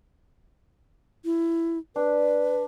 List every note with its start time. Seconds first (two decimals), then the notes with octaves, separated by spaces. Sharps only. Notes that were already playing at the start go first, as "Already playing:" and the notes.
1.25 E4
1.96 D4 B4